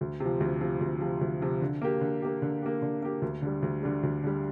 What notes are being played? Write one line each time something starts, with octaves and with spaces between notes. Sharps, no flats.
D2
C3 F3
D2
C3 F3
D2
C3 F3
D2
C3 F3
D3
A#3 G4
D3
A#3 G4
D3
A#3 G4
D3
A#3 G4
D2
D3 G3
D2
D3 G3
D2
D3 G3